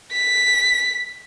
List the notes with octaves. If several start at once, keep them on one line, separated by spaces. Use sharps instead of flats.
B6